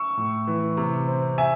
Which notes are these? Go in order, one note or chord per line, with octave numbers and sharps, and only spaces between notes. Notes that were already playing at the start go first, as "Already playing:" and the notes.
Already playing: C#6 E6
A2
E3
C3
C4
E5 G#5